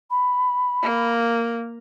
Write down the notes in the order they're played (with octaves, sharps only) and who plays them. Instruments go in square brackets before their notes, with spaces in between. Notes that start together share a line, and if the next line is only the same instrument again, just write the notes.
[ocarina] B5
[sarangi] A#3